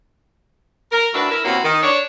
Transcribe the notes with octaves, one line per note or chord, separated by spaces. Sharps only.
A#4
A2 D4 E4 F#4 A#4 B4
E4 A#4
C3 A#3 B3 C#4 E4 F#4
D#3
D4 C#5